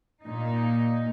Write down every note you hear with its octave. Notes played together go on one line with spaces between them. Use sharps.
A#2 D#4